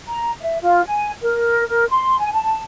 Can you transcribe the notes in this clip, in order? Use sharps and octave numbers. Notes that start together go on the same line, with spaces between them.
A#5
E5
F4
G#5
A#4
A#4
C6
G#5
A5